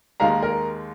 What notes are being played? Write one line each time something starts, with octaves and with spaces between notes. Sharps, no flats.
D#2 D#3 G#3 F5 A#5
A#4